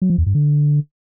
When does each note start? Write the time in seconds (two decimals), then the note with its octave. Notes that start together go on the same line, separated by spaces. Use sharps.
0.02 F#3
0.10 F3
0.18 E2
0.26 G2
0.35 D3